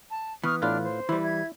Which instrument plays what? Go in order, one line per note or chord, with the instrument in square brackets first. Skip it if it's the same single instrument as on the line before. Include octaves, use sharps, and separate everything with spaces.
[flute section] A5
[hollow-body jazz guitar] E3 B3 [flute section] C#6 D#6 F6
[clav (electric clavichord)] A2 F4 B4 [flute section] D4 F6
[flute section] C5
[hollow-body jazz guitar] E3 G3 [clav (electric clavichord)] E4
[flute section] E5 G#6